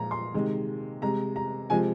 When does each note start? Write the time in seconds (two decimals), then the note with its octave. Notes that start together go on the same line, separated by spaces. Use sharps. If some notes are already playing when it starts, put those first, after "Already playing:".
Already playing: A#2 F3 G#3 A#5
0.11 C6
0.34 C3 D#3 G#3
1.02 C3 G#3 A#5
1.36 A#5
1.70 C3 F3 G#3 G#5